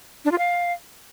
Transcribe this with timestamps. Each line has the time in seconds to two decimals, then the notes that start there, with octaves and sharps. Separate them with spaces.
0.25 D4
0.32 F4
0.38 F5